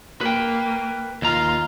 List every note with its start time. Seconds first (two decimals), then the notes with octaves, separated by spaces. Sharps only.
0.21 A#3 B4 G5
1.22 D#2 F4 A#5